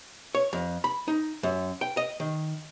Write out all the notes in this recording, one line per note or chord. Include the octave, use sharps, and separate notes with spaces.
C#5
F2
B5
D#4
F#2
G5
D#5
D#3